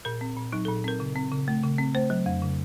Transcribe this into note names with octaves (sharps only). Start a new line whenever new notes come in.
A#2 A#4
C4
A#2
F#3 D#4
A#2 A4
C4 A#4
C#3
C4
C#3
A3
C#3
C4
A3 C5
F#3
F2
C#3